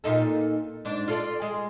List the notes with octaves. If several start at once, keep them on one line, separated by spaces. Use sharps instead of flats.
A#2 D#4 A4
G#2 D4
F4 A4 D5
G#3